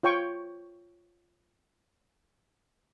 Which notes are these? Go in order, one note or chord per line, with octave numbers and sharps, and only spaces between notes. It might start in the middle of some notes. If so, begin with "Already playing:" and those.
F4 C#5 G5 C#6